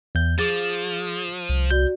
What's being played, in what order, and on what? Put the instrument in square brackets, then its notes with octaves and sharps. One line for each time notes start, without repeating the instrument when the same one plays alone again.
[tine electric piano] E2 G6
[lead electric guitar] F3 [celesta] G#4 D6 E7 [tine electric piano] A6
[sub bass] C2
[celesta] F#4 D5 [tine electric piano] G6